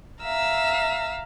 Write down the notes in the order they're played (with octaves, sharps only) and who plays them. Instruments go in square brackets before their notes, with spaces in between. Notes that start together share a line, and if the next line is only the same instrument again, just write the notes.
[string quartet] E5 F5 A#5 E6